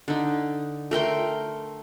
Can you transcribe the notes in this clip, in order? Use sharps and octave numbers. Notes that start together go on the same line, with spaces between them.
D3 D#4
A3 A#4 G5 C6